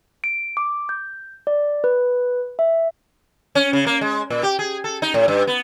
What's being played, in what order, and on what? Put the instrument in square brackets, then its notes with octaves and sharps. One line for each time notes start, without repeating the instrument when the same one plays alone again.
[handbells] D7
D6
G6
D5
B4
E5
[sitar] C#4
C#3
A#3
G#3
A#2
G4
G#4
A4
D#4
A2
G2
B3